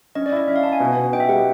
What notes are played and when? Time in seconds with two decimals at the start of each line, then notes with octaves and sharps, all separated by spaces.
0.15 C#4 D#5
0.26 D5
0.32 E4 D#5
0.48 C#4 E5
0.56 F5
0.63 E4 A5
0.73 G#5
0.80 B2
0.97 B2
1.13 D#4 G5
1.20 E5
1.29 G3 F#5